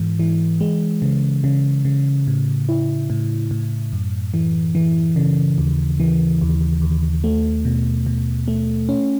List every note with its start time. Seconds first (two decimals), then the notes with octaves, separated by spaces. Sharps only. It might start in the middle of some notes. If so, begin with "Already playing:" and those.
Already playing: G#2 E3
0.19 E3
0.61 G#3
1.02 C#3
1.44 C#3
1.85 C#3
2.27 A2
2.69 E4
3.10 A2
3.51 A2
3.93 F#2
4.34 E3
4.75 E3
5.16 C#3
5.58 D#2
6.00 E3
6.41 D#2
6.82 D#2
7.24 A3
7.65 B2
8.06 B2
8.48 A3
8.89 C#4